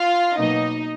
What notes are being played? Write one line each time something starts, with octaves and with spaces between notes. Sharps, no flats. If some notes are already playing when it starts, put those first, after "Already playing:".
Already playing: F4 F5
B2 F#3 A#3 D#4 D#5